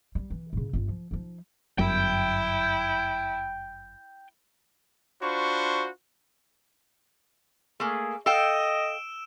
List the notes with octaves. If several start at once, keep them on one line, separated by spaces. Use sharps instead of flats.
G3
E3
A2 C#3
G1 F4
F3
F3 D#4
G1 F#2 E4 G5
D4 F4 F#4 C5 B5 C#6
A3 A#3 G#4
A4 D#5 F5 G5 E6 D7 E7